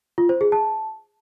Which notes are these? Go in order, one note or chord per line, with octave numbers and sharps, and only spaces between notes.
F4
C5
G#4
A5